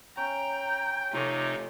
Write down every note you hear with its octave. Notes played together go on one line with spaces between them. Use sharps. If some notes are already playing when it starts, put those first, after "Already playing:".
C#4 G5 A#5
C3 F3 A3 D#4 F4 A4 C#5